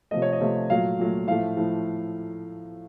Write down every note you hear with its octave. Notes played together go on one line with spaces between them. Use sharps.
C3 F3 A3 D#5
C#5
D#5
C3 F3 A3
A#2 F#3 A3 F5
A#2 F#3 A3
A2 F3 A3 F5
A2 F3 A3